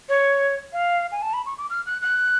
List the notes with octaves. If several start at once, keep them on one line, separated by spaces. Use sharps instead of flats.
C#5
F5
G#5
A5
B5
C#6
D6
F6
F#6
F#6